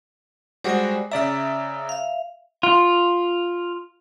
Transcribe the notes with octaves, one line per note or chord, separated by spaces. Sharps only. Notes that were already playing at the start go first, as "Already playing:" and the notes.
G3 G#3 F#4 C5 D5 G#5
C#3 D5 E5 A#5 E6
E5 F5
F4